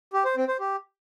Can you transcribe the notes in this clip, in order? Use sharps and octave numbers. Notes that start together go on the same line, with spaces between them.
G4
C5
C4
C5
G4